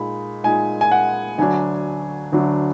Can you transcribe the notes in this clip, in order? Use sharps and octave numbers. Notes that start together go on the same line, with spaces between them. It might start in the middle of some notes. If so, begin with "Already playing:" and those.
Already playing: A#2 G#3 D#4 B5
A#2 G#3 D#4 G#5
G#5
F#5
D2 D3 F#3 D4 G#5
D2 D3 F#3 D4